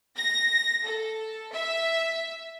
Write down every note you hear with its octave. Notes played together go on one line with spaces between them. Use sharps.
A#6
A4
E5